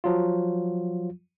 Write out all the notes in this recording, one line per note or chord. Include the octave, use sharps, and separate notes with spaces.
F3 F#3 F4